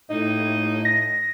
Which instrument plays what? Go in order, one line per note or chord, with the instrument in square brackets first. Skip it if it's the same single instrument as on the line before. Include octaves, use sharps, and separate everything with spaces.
[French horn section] A2 [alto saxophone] D#4
[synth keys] A#6